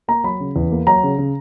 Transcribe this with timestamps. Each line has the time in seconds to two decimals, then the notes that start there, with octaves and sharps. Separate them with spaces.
0.08 A#3 A#5
0.24 F#3 B5
0.40 C#3
0.56 E2
0.72 A#3
0.87 F#3 A#5
1.03 C#3
1.18 C#3